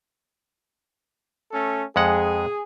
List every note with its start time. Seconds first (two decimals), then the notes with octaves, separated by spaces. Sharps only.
1.51 A3 C#4 A4
1.96 F2 G#3 G#4 F#5